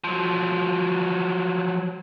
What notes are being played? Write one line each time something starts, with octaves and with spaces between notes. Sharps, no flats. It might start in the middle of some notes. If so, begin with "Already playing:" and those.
F3 F#3